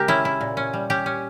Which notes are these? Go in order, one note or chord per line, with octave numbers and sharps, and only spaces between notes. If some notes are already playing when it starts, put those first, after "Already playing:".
Already playing: C#3 G#3 G4 A#4
C#4 E4
E4
A#2
C#4
G3
C#4 G4
C#4